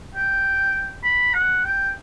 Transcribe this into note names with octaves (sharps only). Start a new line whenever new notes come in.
G5
B5
F#5
G5